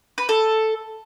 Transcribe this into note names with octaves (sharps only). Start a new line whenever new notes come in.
B4
A4